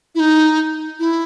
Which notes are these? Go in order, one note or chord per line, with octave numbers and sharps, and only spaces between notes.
E4
D#4
E4